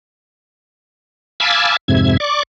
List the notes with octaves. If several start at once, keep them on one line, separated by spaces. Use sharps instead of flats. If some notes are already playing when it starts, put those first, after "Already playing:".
F5 G#5 A5 B5 D6 E6
F2 G#2 C3 E5 G#6
D5 C#6 D6